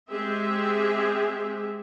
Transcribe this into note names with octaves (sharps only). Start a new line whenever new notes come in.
G#3 C4 G4 G#4 E5